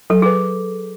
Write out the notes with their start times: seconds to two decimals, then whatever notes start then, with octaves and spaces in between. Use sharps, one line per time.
0.10 F#3 A4
0.22 G#4 B4